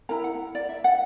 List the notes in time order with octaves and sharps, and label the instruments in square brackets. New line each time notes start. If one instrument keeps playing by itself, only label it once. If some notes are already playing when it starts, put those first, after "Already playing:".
[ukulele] E4 A#4 A#5
F#5
D5
E5
F#5